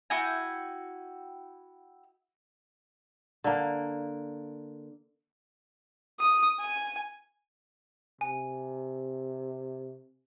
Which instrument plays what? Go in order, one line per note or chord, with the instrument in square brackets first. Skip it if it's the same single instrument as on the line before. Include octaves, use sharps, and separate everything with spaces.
[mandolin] E4 F#4 G5 G#5
[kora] D3 A#3
[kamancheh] D#6
G#5
[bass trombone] C3 [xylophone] G#5